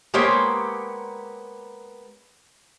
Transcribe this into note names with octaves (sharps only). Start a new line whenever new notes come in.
G#3 A#3 B3 G4 C5 C#5